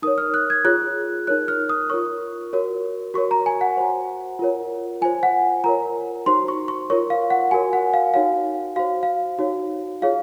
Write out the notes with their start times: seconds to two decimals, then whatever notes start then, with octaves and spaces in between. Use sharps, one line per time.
0.02 D#4 A#4 C#5 D#6
0.18 F6
0.34 F#6
0.50 G#6
0.65 F4 G#4 C#5 F#6
1.27 D#4 A#4 C#5 F#6
1.48 F6
1.69 D#6
1.90 F4 A#4 C#5 C#6
2.53 F#4 A#4 C#5
3.14 F#4 A#4 C#5 C#6
3.31 A#5
3.46 G#5
3.61 F#5
3.77 F#4 C5
4.39 F4 A#4 C#5
5.02 F4 C5 G#5
5.23 F#5
5.64 F4 A#4 C#5 A#5
6.26 D#4 F#4 C5 C6
6.48 C#6
6.68 C#6
6.90 F4 A#4 C#5 C#6
7.10 F5
7.30 F#5
7.51 F#4 A#4 C#5 G#5
7.73 F#5
7.94 F5
8.14 D#4 F#4 C#5 F5
8.76 F#4 C5 F5
9.03 F5
9.39 D#4 F#4 C#5
10.02 F4 G#4 C#5 F5